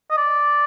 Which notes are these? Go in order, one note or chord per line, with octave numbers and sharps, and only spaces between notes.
D#5
D5